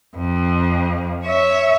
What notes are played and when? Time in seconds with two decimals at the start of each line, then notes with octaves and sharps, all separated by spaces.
0.17 F2
1.26 C#5 E5